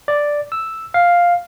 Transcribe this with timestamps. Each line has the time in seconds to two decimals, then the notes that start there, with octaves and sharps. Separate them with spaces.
0.08 D5
0.52 E6
0.94 F5